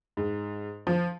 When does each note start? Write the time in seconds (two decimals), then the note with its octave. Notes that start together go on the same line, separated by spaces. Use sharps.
0.17 G#2
0.87 F3